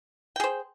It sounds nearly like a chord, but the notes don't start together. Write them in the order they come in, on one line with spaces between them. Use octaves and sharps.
G5 G#4 C5